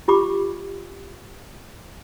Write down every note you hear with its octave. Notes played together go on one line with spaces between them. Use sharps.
F4 G4 B5 D6